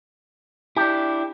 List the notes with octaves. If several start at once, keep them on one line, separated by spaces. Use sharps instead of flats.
D4 E4 G4